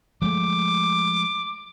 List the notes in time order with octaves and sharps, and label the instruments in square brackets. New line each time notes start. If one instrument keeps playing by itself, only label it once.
[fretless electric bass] F3 G#3 A3 [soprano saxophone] D6